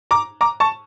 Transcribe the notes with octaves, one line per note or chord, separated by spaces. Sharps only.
A#5 D6
A#5 D6
A5 C#6